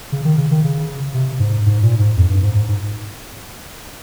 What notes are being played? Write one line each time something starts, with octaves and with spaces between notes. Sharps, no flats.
C#3
D#3
C#3
D#3
C#3
C3
G#2
G#2
A#2
G#2
F2
G2
G#2
G#2
G#2